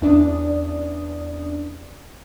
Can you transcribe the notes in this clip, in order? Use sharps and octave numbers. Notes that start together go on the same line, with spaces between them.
E2 C#4 D4 D5 D#6